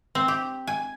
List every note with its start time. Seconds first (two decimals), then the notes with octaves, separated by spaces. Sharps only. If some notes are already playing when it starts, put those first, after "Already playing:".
0.15 C4
0.28 G4
0.67 G#5